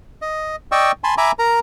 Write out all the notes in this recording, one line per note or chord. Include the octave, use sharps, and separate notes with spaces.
D#5
D5 D#5 G5 C#6 E6
G#5 A5 B5 C6
E5 G#5 A#5 B5 D6
A#4 A#5